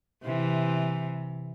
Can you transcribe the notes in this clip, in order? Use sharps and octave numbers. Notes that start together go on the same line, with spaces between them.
C3 E3